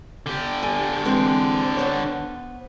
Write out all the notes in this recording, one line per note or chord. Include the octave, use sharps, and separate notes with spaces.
D3 G4
G#5
E3 G#3 C4
B3 C5 C#5